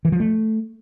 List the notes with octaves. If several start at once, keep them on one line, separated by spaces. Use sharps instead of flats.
E3
F3
A3